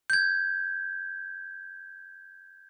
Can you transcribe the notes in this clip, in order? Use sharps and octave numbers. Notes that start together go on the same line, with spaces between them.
G6 G#6